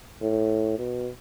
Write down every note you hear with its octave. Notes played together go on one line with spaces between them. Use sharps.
A2
B2